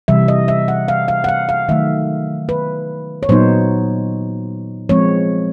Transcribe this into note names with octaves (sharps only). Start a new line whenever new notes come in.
C3 E3 G3 E5
D#5
E5
F#5
F5
F5
F#5
F5
F5
D#3 F#3 A3 E5
B4
C#5
A#2 F#3 B3 D#4 C5
F3 G#3 C4 C#5